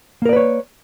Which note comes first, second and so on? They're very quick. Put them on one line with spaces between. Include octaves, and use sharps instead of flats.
A#3 A#4 D5 B4 C#5